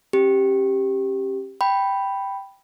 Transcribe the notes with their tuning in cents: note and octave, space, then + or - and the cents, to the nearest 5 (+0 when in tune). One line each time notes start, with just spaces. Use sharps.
C#4 -40 G4 +0
G5 +0 B5 +0